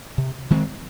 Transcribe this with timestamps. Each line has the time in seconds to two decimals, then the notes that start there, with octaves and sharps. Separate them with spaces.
0.18 C3
0.50 D#3 G#3 C4